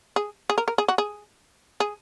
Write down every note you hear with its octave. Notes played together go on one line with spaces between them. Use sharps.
G#4
G#4
A#4
A#4
G#4
F#4
G#4
G#4